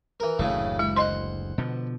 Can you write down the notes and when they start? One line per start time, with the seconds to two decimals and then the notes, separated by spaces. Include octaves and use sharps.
0.20 E3 A#4
0.39 F#1 D2 A2 C#3 E3 A3
0.79 G#3 E4
0.96 C5 D#5 F#5 C6
1.58 B2 D3 F3